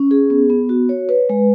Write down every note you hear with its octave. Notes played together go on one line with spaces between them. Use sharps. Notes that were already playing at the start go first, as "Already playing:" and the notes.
Already playing: C#4
G#4
B3
B3
F#4
C#5
B4
G#3